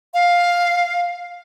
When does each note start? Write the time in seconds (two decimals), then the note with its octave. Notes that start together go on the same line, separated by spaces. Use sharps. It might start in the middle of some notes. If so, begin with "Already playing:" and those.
0.14 F5